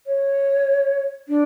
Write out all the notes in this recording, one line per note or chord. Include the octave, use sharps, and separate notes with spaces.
C#5
D4